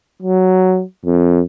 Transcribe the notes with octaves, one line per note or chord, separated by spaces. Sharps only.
F#3
F2